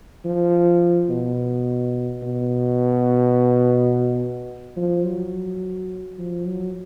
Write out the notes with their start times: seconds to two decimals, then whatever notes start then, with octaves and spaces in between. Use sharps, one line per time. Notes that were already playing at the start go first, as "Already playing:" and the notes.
0.25 F3
1.10 B2
2.23 B2
4.77 F3
5.05 F#3
6.18 F3
6.46 F#3